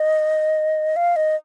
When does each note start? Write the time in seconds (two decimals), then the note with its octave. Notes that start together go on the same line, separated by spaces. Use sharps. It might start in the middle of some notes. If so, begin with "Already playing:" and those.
Already playing: D#5
0.96 F5
1.16 D#5